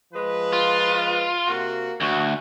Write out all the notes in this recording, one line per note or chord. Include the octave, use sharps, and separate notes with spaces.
F3 G#3 B4
F4
C3 A#3 F#4
D2 F#4